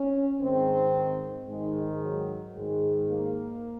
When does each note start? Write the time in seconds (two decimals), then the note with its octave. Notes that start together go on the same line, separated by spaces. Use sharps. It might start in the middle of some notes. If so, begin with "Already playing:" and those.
Already playing: C#4
0.41 G#2 D#3 C4
1.48 G#2 D#3 G#3
2.02 F#3
2.55 G#2 D#3 G#3
3.09 A#3